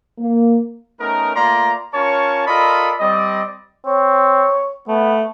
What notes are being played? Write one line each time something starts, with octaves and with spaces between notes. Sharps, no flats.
A#3
A3 B3 C#4 D#4 A#4
A3 A#3 F4 D5 A#5 C6
C#4 F4 A#4 C#5 A5 C#6
F4 A4 A#4 D5 D#5 B5
G3 C4 D5 D#5
C4 C#5
A3 B3